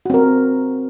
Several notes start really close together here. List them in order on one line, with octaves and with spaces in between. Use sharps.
F#4 C4 A#4